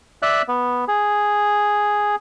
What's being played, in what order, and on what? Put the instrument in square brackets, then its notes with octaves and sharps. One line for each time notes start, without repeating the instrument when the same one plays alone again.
[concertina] D5 E5 F#6
B3
G#4